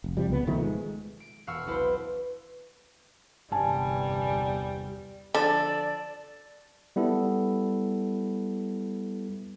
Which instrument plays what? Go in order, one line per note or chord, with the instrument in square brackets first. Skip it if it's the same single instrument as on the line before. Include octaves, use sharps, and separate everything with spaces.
[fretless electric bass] F1
C3 F3 G3
C#2 B3
B2 D#3 F3 A3
G#3
[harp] D7
E1 F5 F#5 C#6 E6 F6
B1 E4 B4 C5 B5
[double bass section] G1 E2 C3 [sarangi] G3 [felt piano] G#5 A5
[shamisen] D3 F3 [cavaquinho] A4 [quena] D5
[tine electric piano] G3 B3 E4 A4